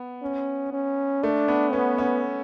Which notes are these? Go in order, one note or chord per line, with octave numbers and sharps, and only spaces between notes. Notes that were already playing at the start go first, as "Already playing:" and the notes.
Already playing: B3
C#4
C#4
A3 D4
B3
B3 C#4
C#4